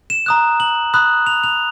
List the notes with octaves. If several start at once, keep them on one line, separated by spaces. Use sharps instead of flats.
E7
A#5 D#6 F#6
F#7
B5 D#6 F#6
F7
F7